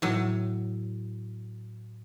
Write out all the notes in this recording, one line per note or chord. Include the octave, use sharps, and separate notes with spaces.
A2 F#3